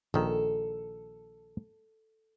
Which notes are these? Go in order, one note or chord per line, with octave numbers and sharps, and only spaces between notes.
A#1 D#3 A4